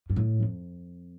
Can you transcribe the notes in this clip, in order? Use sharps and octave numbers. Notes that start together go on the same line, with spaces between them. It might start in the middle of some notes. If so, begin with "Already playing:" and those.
G2
A2
F2